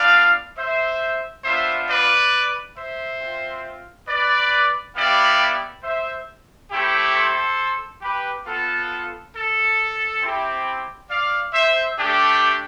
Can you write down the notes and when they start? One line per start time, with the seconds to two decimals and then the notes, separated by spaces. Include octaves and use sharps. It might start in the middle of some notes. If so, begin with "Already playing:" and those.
Already playing: B3 D4 F4 D5 F5
0.56 C5 E5
1.44 B3 D4 F4 C5 E5
1.88 B4 D5
2.76 C5 E5
3.20 C4 F4
4.07 B4 D5
4.95 G3 B3 E4 G4 D5 F5
5.83 C5 E5
6.71 A3 C4 E4 G4
7.15 A4 C5
8.02 G4 B4
8.46 B3 F4 A4
9.34 A4
10.21 C4 E4 G4
11.09 D5 F5
11.53 C5 E5
11.97 A3 D4 G4